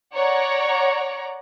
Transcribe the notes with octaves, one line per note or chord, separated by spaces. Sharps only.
C#5 D5 F#5 A#5